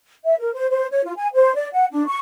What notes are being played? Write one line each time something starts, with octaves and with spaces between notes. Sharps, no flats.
E5
A#4
C5
C5
C#5
F4
G#5
C5
D5
F#5
D4
C#6